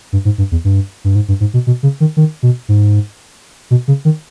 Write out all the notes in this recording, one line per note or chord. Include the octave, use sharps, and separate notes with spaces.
G2
G#2
G2
E2
G2
G2
G#2
G2
G#2
B2
B2
C#3
D#3
D#3
B2
G#2
B2
C#3
D#3